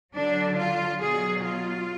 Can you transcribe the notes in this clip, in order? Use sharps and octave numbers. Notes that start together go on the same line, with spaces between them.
D3 F#3 D4
F4
B2 F#3 G#4
F4